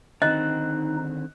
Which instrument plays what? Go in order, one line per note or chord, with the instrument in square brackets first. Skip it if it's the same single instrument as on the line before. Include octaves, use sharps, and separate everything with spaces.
[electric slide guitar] D3 D#3 C4 [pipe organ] D#4 [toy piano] D#5 [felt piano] F#6